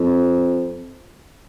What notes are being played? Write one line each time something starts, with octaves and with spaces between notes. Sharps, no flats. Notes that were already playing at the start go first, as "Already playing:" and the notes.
Already playing: F2